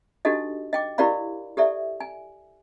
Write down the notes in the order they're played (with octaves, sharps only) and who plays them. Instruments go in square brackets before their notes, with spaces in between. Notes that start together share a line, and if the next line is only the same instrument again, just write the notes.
[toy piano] D4 D#4 F#4 G4 A4 D#5
D#5 G5 D6
E4 G4 A#4 D5 F5 B5
G4 A4 D5 E5
G#5